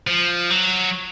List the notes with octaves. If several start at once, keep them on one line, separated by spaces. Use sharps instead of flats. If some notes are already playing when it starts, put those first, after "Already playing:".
F3
F#3